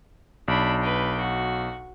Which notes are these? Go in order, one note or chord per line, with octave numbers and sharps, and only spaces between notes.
B1 D4 B5
B4 G5
F#4